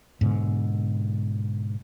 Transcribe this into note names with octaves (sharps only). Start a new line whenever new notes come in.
G#2 B2 D3